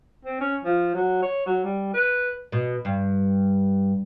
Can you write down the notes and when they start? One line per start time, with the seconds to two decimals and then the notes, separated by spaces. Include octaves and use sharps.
0.25 C4
0.41 C#4
0.64 F3
0.94 F#3
1.22 C#5
1.46 F#3
1.64 G3
1.94 B4
2.52 B2
2.85 G2